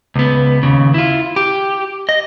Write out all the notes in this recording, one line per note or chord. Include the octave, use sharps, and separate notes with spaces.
C#2 B3
D#2 C#3
E4 F4
G4
D#5